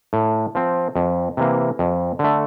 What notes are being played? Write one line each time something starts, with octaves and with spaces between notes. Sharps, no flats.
A2
F3 C4
F2
C3 E3 A#3
F2
D3 A3